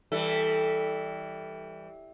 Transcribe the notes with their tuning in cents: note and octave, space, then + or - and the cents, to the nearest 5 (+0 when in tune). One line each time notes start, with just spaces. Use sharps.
E3 -15 G3 +5 A4 +0